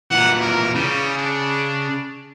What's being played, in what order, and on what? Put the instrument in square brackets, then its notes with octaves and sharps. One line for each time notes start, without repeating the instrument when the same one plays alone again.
[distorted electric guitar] A#2 E3 [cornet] F#5
[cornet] A#4
[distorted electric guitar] C#3 [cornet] G3
[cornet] D4